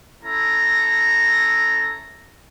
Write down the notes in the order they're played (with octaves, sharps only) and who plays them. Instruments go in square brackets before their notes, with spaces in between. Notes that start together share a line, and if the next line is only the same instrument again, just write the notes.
[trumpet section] C#4 E4 A4 A#5